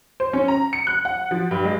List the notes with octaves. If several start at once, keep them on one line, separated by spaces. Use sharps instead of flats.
C5
C#4
A#5
C#7
F#6
F#5
F3
G2
G#3